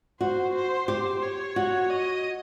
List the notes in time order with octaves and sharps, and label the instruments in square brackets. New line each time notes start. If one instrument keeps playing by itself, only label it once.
[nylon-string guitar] F#4 [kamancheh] C5
[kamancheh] C5
[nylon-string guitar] G4 [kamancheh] C5
[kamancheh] C#5
[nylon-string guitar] F#4
[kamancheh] D#5